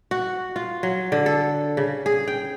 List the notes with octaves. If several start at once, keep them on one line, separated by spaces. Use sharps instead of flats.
F#4
F4
F#3
D3
A4
C#3
G#4
G5